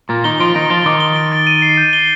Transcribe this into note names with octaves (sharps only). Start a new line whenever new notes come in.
A#2 A#3 A6
D#3 D#4 G7
F3 F4 D7
D#3 D#4 D7
F3 F4 A6
D#3 D#4 D6
G7
D7
A6
D#7
C7
G6
G7